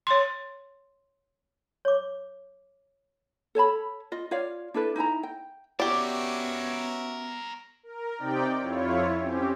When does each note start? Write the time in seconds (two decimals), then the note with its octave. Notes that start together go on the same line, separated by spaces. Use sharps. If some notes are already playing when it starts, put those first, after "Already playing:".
0.07 C#5 C6
1.85 C#5 D6
3.55 A4 C#5 A5 B5
4.12 F4 D#5
4.31 F4 C#5 D5 F5
4.74 D4 E4 A4 B4
4.96 D#4 E4 G#5 A#5
5.23 G5
5.80 B3 C#4 F#4 G4 A#4 C#5 D5 E5
7.83 A#4
8.17 C3 C4 D#4 G4 D5 G5
8.59 F2 E4 F4 C#5
9.18 C4 C#4 G4